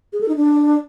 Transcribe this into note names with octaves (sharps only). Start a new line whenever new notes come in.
G#4
A4
D#4
D4